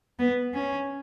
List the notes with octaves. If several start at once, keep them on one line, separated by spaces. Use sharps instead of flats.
B3
C#4